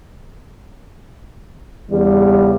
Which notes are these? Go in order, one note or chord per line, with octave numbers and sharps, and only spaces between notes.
E2 C#3 G3